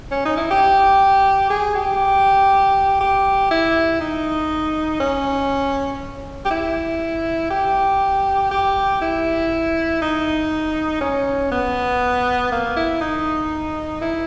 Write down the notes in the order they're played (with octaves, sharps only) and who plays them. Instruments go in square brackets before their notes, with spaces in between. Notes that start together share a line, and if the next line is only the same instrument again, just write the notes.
[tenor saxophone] C#4
D#4
E4
G4
G#4
G4
G4
E4
D#4
C#4
G4
E4
G4
G4
E4
D#4
C#4
B3
A#3
E4
D#4
E4